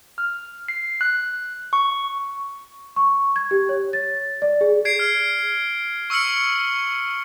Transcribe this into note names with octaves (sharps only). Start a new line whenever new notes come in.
F6
C7
F#6
C#6
C#6
G#6
G4
C#5
A6
D5
G#4
G#6 C7 D7
F6
C#6 E6 F6 C#7 F#7